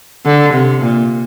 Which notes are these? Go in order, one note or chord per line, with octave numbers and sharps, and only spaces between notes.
D3
C3
A#2